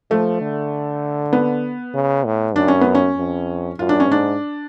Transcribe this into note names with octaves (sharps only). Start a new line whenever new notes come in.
F3 A3
D3
B3
C#3
A2
F#2 D4
C#4
B3
C#4
F2
F#2 F4
D4
C#4
G#2 D4